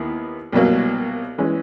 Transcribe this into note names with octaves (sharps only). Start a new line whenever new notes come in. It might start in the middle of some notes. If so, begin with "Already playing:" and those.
Already playing: D#2 D#3 B3 E4
C2 B2 F#3 A#3
E3 G#3 C#4